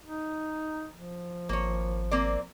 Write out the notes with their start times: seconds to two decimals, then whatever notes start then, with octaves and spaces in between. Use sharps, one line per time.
0.03 D#4
0.94 F3
1.49 G#1 A#3 C#5
2.11 A#3 C4 D5